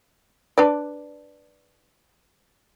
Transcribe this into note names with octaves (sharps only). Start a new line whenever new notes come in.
D4 B4 D5